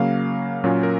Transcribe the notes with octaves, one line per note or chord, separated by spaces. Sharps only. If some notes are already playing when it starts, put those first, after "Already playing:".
Already playing: C#3 F#3 A#3 F5
A#2 F#3 C#4 F4
A#4